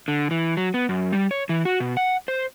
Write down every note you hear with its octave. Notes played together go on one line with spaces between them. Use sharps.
D3
E3
F#3
B3
F#2
G3
C#5
E3
F#4
B2
F#5
C5